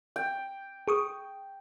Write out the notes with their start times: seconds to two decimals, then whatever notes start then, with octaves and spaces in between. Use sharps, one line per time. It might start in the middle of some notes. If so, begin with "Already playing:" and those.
0.16 G5
0.88 G#4 C#6 D#6